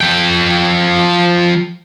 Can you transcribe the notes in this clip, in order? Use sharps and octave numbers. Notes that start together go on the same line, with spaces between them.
F3 G5